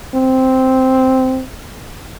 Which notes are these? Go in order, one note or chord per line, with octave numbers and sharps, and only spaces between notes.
C4